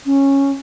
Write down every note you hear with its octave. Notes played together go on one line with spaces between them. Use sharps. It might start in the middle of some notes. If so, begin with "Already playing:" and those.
C#4